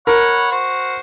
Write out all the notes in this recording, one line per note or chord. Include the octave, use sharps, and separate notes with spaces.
A#4 C#5 F#5 B5
F#4 C5